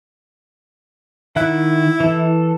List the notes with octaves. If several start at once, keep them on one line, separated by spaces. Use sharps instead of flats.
D#3 E4 F#5 F#6
E3 A4